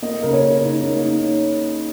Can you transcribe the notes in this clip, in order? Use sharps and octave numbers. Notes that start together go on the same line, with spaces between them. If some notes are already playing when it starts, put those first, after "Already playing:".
A#3 D#5
C#3 A#4
C#5
A#3
D#4
A#3
D#4